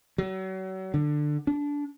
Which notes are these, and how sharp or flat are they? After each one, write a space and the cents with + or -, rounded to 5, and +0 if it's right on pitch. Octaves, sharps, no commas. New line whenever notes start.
F#3 +35
D3 +15
D4 -20